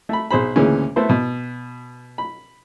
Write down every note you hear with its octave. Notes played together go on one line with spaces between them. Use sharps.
A3 B5
B1 G#4 C5 B5
D2 A#2 C#3 E3 G#3 C#4
A3 B3 E4 C5
B2
B5